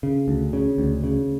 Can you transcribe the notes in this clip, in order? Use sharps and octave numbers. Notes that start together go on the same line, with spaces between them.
C#3
D2
C#3
D2
C#3